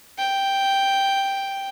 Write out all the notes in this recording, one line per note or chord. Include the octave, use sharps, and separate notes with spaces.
G5